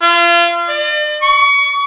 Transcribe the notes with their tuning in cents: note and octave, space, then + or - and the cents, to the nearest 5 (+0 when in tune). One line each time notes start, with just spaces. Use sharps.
F4 -30
D5 +40
C#6 +30